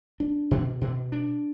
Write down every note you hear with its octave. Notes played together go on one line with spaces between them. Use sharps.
D4
B2
B2
D4